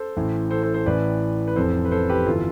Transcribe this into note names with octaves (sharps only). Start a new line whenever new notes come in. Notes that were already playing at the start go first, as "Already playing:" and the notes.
Already playing: A4 C5
A1 A2 E3
A4 C5
A4 C5
A4 C5
A1 A2 E3 B4 D5
B4
F1 F2 E3 A4 C5
B4
A4 C5
G4 B4
G1 E3 F4 A4